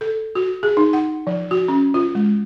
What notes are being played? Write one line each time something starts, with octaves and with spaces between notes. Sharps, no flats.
A4
F#4
G#4
D#4
F#5
F3
F#4
C#4
F4
G#3